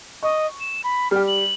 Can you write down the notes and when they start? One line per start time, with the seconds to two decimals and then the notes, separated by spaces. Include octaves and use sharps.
0.23 D#5 C#6
0.60 E7
0.84 B5
1.11 G3 G4 F6
1.27 F#7